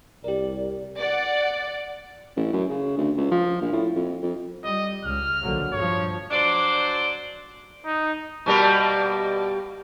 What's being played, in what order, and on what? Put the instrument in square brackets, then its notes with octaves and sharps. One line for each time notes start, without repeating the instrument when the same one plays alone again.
[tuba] C2 [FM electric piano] G4 A#4 [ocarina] D5
[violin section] D5 F#5
[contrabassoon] A1
F#2
C#3
D2
C#2
F3
A#1
A2
F2
F2
[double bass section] G3 [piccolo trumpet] D#5
[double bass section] C#2 [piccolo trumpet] F6
[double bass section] A#1 D3 F#3
[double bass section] G2 F3 [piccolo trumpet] C#5
[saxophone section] F#3 D4 C5 D5
[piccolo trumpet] D#4
[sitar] B2 G3 A#3